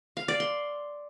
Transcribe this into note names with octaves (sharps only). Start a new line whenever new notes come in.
F5
D5
C6